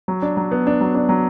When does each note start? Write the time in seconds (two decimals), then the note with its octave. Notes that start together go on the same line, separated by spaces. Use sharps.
0.08 F#3
0.22 D4
0.37 F#3
0.51 B3
0.67 D4
0.81 F#3
0.95 D4
1.09 F#3